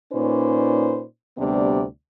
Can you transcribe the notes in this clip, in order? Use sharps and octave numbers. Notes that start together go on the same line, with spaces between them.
A#2 C#4 D#4 B4 C5 D5
D2 C3 G3 B3 D4 D5